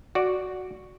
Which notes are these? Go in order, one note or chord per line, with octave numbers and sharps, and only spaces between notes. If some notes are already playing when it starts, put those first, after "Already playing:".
F#4 D5